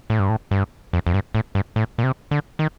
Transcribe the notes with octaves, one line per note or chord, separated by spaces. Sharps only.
A2
G2
A2
G2
F2
F2
G2
A2
G2
A2
A#2
C3
D3
D#3